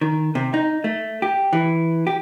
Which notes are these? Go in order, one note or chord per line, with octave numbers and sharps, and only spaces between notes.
D#3
C3
D#4
A3
G4
E3
G4